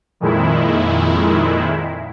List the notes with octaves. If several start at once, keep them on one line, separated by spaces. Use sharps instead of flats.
F2 A#2 D#3 G#3 E4